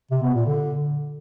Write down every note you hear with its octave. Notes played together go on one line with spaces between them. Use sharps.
C3
B3
A#2
D3